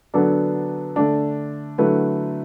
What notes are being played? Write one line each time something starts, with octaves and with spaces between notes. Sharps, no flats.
D3 F#3 B3 D4 A4
D3 A3 D4
D3 F#3 A3 E4 B4